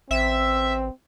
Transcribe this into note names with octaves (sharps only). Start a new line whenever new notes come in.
A1 C4 E5